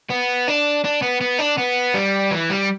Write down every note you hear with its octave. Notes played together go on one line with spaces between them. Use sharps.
B3
D4
D4
B3
B3
D4
B3
G3
E3
G3